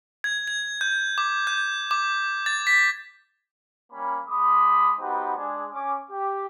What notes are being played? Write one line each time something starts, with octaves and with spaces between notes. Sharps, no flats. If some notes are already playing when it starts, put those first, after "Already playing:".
G#6
G#6
G6
D6
G6
D6
A6
B6
G3 A#3 C#4 B5
G#3 B5 D6 D#6
B3 D#4 F#4 G4 B4 C5
G#3 D4 G#4 G#5
C#4 D6
G4